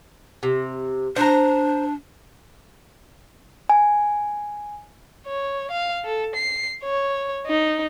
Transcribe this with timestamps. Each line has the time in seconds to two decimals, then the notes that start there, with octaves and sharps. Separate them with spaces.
0.43 C3
1.16 D4 C5 A#5
3.69 G#5
5.27 C#5
5.71 F5
6.05 A4
6.36 C7
6.84 C#5
7.47 D#4